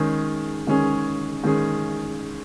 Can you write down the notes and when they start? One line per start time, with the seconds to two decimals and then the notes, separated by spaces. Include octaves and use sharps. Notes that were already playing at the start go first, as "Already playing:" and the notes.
Already playing: D#3 G#3 C#4 G#4
0.67 D#3 G#3 C#4 G#4
1.44 D#3 G#3 C#4 G#4